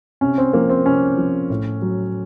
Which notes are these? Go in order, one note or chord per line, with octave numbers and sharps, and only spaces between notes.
C3 C#4
C4
F3 A#3
C4
C3 C#4
F3
A2
F#3